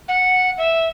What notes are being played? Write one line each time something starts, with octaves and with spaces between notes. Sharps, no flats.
F#5
E5